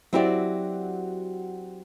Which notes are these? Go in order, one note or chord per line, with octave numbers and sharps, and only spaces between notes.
F#3 C4 E4 F#4 G4 D5